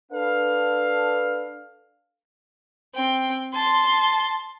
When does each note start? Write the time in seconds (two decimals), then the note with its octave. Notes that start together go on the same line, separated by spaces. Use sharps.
0.12 D4 A4 B4 F5
2.95 C4 G5
3.53 A5 C6